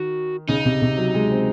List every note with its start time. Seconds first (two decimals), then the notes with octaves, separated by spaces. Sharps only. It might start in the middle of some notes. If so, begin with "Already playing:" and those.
Already playing: D#3 F#4
0.49 C#3 D#4
0.65 C3
0.82 C3
0.97 F#3
1.14 G#3
1.31 C4